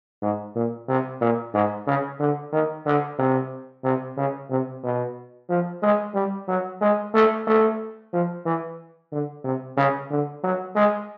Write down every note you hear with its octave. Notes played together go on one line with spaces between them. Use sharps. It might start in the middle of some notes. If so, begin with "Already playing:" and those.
G#2
A#2
C3
A#2
G#2
C#3
D3
D#3
D3
C3
C3
C#3
C3
B2
F3
G#3
G3
F#3
G#3
A3
A3
F3
E3
D3
C3
C#3
D3
F#3
G#3